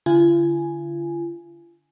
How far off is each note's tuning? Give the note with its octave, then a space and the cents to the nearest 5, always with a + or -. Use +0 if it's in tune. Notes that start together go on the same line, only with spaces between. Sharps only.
D3 -10 F4 -45 G#5 +5